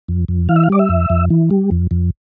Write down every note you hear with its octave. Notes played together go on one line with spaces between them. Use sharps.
F2
F2
E3 F5
E5
F5
G3 D5
E5
F2
F2
E3
G3
F2
F2